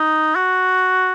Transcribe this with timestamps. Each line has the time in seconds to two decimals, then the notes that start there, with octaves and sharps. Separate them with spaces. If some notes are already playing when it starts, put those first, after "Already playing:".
Already playing: D#4
0.36 F#4